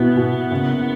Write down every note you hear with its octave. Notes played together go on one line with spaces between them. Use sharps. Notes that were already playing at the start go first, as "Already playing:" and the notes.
Already playing: B2 B3 E4
B2
F#1